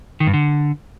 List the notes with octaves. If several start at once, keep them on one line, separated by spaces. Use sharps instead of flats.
D#3
G2
D3